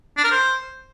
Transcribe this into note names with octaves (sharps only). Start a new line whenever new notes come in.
D4
A#4
C5